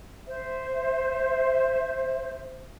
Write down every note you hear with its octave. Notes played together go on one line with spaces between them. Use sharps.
C5 E5